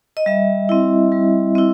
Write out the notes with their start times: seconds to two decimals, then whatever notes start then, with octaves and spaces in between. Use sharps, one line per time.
0.17 D#5
0.26 G3 E5
0.69 C4 E4
1.12 G3
1.55 C4 E4